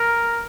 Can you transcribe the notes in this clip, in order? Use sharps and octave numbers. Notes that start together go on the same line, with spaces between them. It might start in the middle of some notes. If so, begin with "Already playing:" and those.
Already playing: A#4